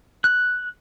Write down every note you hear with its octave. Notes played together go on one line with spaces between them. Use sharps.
F#6